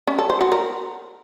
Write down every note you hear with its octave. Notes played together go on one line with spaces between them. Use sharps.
C#4
A4
C5
F#4
A#4